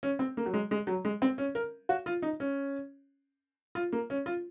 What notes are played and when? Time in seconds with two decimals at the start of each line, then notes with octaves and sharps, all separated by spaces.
0.03 C#4
0.19 C4
0.37 A#3
0.46 F#3
0.54 G#3
0.71 G#3
0.87 F#3
1.05 G#3
1.22 C4
1.38 C#4
1.55 A#4
1.89 F#4
2.06 F4
2.22 D#4
2.40 C#4
3.75 F4
3.93 A#3
4.10 C#4
4.26 F4